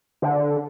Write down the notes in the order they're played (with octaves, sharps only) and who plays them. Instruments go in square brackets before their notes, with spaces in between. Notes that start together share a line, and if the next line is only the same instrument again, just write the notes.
[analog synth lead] D3